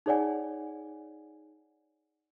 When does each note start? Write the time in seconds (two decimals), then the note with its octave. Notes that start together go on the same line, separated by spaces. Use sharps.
0.06 D#4 G#4 C#5 D5 F#5 G#5